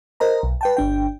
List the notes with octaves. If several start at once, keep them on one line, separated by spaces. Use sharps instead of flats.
A#4 C5 D#5 A#5
B1
B4 G5 A5
G1 D4 G5